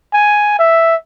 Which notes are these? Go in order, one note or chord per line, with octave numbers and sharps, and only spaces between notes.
G#5
E5